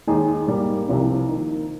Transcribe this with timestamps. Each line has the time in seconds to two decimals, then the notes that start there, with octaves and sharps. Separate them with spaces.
0.07 D#2 D#3 G#3 D#4 G#4
0.47 G#2 G3 A#3
0.88 C2 C3 F3 C4
1.29 D#3 A#3 D#4